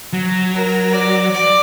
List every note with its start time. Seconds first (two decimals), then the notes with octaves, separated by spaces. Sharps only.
0.13 F#3
0.53 A#4
0.93 D5
1.33 D5